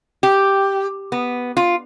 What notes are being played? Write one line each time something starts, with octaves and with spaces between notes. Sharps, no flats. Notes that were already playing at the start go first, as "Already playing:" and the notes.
G4
B3
F4